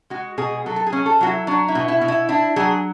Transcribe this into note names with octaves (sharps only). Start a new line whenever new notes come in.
G#3 F#4
B2 G#4
F#3 A4
A4
G#4
C#4
A4
F#3 F#4
E4
F#3 D4
E4
B2
E4
B2
E4
D4 E4
F#3 G#4